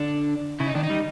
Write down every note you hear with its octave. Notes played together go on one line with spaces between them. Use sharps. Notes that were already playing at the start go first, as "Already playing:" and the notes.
Already playing: D3 D4
C#3 E4
D#4
D#3 D4
D#4
G3